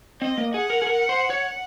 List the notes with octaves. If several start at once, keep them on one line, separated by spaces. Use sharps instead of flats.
C4 D#5
A#3
G#4 F#5
A#4
G#4
A#4
C5
C#5